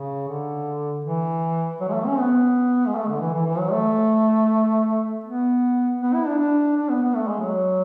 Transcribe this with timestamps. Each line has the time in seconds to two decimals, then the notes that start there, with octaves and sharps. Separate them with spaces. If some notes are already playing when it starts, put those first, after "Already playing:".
Already playing: C#3
0.28 D3
1.05 E3
1.81 F#3
1.89 G#3
1.93 A3
2.07 C#4
2.20 B3
2.87 G#3
2.96 A3
3.08 D3
3.20 E3
3.34 E3
3.46 E3
3.59 F#3
3.72 A3
5.24 B3
6.01 B3
6.14 E4
6.27 D4
6.38 D4
6.76 D4
6.89 B3
7.02 B3
7.15 A3
7.28 G#3
7.41 F#3